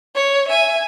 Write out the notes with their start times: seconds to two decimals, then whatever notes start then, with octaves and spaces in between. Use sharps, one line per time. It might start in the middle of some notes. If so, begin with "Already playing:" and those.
0.15 C#5
0.48 E5 G#5